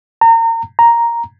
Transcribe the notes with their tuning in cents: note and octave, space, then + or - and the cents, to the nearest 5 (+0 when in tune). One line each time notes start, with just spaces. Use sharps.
A#5 -35
A#5 +0